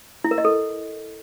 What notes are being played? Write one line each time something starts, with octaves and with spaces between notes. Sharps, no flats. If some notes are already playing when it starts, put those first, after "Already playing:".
E4
A#4
D#5
A4